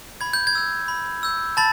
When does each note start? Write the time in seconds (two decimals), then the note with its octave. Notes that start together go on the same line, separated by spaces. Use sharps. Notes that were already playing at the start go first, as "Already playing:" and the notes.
0.21 B5 G#6
0.33 G6
0.47 G#6
0.55 E6 G6
0.88 B5
1.23 E6 G6
1.57 A5 B5 A6